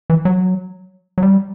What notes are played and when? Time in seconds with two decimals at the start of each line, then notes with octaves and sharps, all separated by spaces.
0.10 E3
0.25 F#3
1.18 F#3
1.22 G3